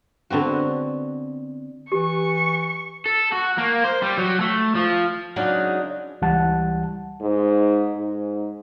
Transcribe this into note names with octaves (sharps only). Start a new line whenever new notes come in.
D3 B3 C4 F#4
E3 G4 C#6
A4
F#4
A#3
C5
G3
F#3
A3
F3
C#3 F#3 G#3 D4 D#4
C#2 E3 G3 F#5 A5
G#2
G#2